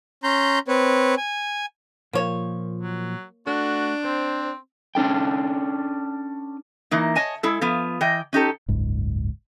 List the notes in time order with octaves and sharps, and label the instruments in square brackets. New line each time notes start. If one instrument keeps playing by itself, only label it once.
[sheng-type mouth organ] C#4 A#5 C6 G6
C4 B4 C#5
G#5
[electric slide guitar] A#2 F3 [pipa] A#3 C#5
[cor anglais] F#3
[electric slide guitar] A3 A4 [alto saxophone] D4 [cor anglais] F#4
[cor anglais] C4 [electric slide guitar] C5
[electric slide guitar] C#4 D4 A4 G5
[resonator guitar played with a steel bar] E3 A#3 D#4
C#5 D#5 G#5 A5
G#3 E4 A4
F3 B3 F4
E3 D#5 G5
C#4 D#4 G4 A4
[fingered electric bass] F#1 C#2 G#2